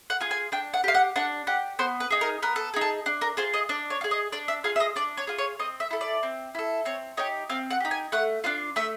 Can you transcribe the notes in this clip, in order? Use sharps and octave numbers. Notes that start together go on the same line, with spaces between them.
F#5
F4 G#4
G#5
D4 G5
F#5
G4 F5
F#5
D4 F#5
G4 F#5
B3 C5
B4
D#4 G#4
A#4
B3 A#4
A4
D#4 G#4
A4
D4
A#4
F4 G#4 C5
D#5
D4 D5
C#5
F4
G#4
D#5
D4 D5
E5
F4 G#4 F5
E5
D#5
D4 D5
C#5
F4 G#4
C#5
C4 D#5
E5
E4 A4
D5
C4
E4 A4
C4 C#5
D#4 G4 C#5
C4 F5
F#5
D#4 G4
G#5
A3 F#5
D4 F4 F5
A3 E5